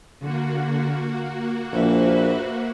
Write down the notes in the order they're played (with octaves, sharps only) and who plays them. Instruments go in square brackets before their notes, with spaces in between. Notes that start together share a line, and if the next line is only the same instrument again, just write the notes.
[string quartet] D3 [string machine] A#3 F#4
[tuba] A#1 [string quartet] B4 C5 E5